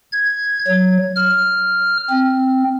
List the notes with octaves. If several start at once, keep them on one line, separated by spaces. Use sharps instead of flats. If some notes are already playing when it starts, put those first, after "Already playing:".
G#6
F#3
F6
C4